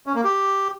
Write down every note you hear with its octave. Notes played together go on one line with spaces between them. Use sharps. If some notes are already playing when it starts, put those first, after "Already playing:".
C#4
A#3
G4